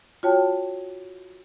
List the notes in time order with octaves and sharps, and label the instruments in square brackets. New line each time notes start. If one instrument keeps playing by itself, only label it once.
[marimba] F4 F#4 C#5 G5 A5